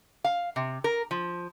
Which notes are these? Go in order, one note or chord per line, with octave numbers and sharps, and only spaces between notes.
F5
C3
A#4
F3